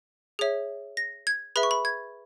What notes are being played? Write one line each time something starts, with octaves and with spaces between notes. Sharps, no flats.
G#4 C#5 E5
A#6
G#6
G#4 B4 E5 B5
C#6
B5
G#6